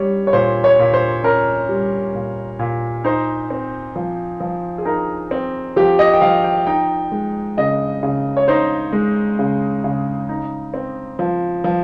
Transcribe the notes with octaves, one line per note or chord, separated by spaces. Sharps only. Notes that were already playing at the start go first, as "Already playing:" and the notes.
Already playing: G3 C#4 C#5
C#5
A#2 C5
C#5
A#2
C5
C#4 A#4
G3
A#2
A#2
D#4 C5
C4
F3
F3
G#4
D#4 A#4
C4
F3 G4
D#5
G5
F3 F5
G5
D#4 G5
G#3
C#3 D#5
C#3
C#5
D#4 C5
G#3
C#3
C#3
D#4
C4
F3
F3